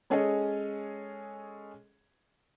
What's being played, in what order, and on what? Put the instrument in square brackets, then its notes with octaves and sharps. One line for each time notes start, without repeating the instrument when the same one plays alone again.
[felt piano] G#3 C#4 G#4 A4 C#5 D#5